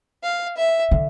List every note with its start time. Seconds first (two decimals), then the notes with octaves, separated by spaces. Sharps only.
0.23 F5
0.57 E5
0.91 D3